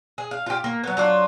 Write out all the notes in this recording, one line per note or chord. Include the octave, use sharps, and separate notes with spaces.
G#4
F5
F4 G4
A#3
F#3 B3
F#3 D4 F4